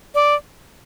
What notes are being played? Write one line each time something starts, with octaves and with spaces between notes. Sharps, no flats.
D5